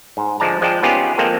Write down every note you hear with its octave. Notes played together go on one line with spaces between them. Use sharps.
G#2
D3 F3 G#3 D5 A5 A#5
F3 G#3 D5 G5 A5
B3 C#4 D#4 F4 G4 G#4
F3 G#3 A#3 C4 A4